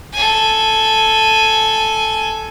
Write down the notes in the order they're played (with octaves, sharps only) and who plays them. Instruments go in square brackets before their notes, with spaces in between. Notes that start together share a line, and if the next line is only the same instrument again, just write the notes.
[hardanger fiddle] A4 G#5